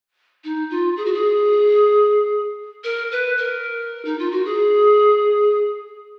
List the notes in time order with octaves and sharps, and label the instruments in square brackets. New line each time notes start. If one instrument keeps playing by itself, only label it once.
[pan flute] D#4
F4
G#4
F#4
G#4
A#4
B4
A#4
D#4
F4
F#4
G#4